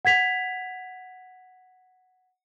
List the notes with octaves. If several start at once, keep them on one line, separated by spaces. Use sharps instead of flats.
F#5 G#6 B6 F7